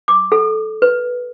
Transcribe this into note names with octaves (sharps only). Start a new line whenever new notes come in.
D6
A4
B4